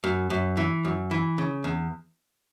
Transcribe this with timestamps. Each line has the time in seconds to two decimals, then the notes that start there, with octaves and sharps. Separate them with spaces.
0.04 F#2
0.30 F#2
0.57 E3
0.85 F#2
1.11 E3
1.38 C#3
1.64 E2